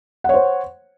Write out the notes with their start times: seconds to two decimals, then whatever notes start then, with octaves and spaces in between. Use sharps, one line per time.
0.24 F#5
0.29 C#5
0.34 C5